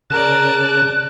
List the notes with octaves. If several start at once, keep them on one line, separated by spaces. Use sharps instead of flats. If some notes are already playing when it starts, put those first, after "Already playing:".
C#3 A#4 D5 A5 F#6